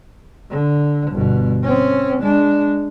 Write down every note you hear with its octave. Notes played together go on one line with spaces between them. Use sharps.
D3
G1 B2
C4 C#4
G#3 D4